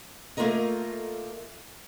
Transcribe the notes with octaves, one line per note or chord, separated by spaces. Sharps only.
A3 A#3 F4 A4 A#4 D#5